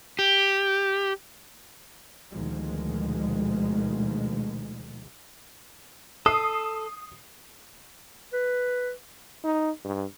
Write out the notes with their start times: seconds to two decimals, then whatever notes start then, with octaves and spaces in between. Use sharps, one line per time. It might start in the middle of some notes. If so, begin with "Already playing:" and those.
0.19 G4
2.32 D2 B2 D#3 F3 G#3
6.26 A4 D#6 C7
8.33 B4
9.44 D#4
9.85 G2